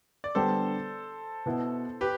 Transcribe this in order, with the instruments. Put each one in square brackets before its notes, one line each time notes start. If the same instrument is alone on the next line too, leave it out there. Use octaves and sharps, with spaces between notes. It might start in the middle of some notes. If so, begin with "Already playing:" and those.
[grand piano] D5
[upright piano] D3 G3 B3 D4 G4 [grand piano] A4 C5
[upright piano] B2 B3 E4
[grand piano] G4 B4